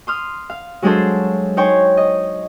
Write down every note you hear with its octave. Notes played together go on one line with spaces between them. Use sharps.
C6 D#6 F6
F5
F#3 G#3 D4 G#4 A4 C5
D#4 C5 C#5 G5 G#5
D#5